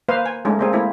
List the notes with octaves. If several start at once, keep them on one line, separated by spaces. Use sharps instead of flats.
A#3 B4 C5 F5
G#5
G#3 A3 C#4 D#4
A#3 C4 G#4
A3 A#3 C4 E4